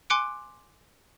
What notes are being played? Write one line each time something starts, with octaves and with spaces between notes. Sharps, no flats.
G#5 C6 D6 F#6 C#7 D7